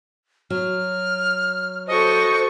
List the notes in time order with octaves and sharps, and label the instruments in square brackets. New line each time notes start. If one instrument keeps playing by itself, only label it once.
[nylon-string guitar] F#3 [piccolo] F6
[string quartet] F#4 A4 C#6 [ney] C5 [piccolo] D#5